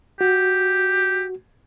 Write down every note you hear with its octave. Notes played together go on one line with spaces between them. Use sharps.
F#4 G4